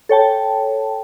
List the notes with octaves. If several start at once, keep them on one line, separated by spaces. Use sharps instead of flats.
A4 C#5 G5 A5